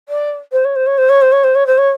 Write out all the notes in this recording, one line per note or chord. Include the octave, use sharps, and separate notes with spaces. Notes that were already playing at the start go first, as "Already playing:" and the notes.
D5
C5
C#5
C5
C#5
C5
C#5
C5
C#5
C5
C#5
C5
C#5